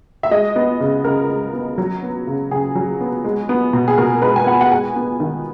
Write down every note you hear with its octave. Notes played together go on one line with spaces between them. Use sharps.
E5
G#3 D#5
B3
C#3
C#3 A#4
G#3
B3
F#3
B3
C#3
C#3 G#4
F#3
B3
G#3
B3
B2
G#4
B2 A#4
G#3 B4
G#5
B3 F#5
F#5
G#3 G#5
B3
D#3